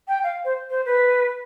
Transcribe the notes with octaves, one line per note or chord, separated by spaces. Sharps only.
G5
F5
C5
C5
B4